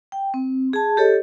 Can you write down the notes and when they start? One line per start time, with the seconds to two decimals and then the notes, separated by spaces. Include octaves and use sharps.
0.12 G5
0.34 C4
0.73 G#4 A5
0.97 G4 A4 C#5 D#5